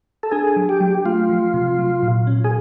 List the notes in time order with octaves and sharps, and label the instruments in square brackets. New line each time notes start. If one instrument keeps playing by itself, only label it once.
[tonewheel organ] A4
[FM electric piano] D4 [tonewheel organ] G#4
[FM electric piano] F#3
[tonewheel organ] G4
[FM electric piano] F#3
[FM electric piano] A3 [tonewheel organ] F4
[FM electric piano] F3
C3
F#3
A#2
C#4
[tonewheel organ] G#4